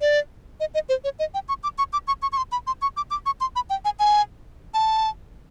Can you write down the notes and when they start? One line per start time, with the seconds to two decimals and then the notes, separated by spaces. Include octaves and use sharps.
0.01 D5
0.60 D#5
0.74 D#5
0.89 C5
1.04 C#5
1.19 D#5
1.34 G5
1.49 C#6
1.64 D6
1.78 C#6
1.93 D6
2.08 C#6
2.22 C#6
2.32 C#6
2.37 C6
2.52 B5
2.67 C6
2.82 C#6
2.97 D6
3.11 D6
3.26 C#6
3.41 C6
3.56 B5
3.70 G5
3.85 G#5
3.99 G#5
4.74 A5